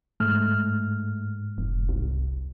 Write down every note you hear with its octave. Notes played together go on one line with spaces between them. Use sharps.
G#2 A3 F6
F1
C2